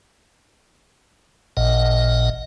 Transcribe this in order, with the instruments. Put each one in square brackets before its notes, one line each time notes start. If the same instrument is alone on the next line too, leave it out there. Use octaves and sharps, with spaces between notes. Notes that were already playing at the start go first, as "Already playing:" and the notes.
[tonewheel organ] A1 A#2 D#5 F#5